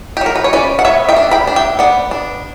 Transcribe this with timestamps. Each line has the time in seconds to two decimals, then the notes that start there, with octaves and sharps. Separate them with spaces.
0.17 G4
0.21 F#3 A#4
0.36 B4
0.44 C#5
0.53 C#4 B4 D5
0.79 F#5
0.85 B3 C#5 E5
1.09 E5 G5
1.16 D4
1.31 G5 B5
1.47 D4
1.56 E5 G5
1.79 B3 D5 F#5
2.11 D4